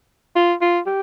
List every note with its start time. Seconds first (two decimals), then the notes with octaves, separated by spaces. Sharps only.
0.36 F4
0.61 F4
0.87 G4